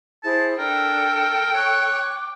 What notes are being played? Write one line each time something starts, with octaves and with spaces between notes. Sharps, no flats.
E4 G#4 C5 A5
D4 A4 A#4 G5
C#5 C#6 F#6
D6